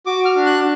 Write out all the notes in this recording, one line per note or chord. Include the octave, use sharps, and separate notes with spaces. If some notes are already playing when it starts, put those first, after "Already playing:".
F#4 D6
F6
D4
F#6